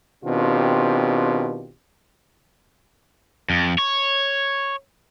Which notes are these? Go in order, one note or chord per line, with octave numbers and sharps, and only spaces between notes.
B2 D#3 C4 D4 F4 G4
F2
C#5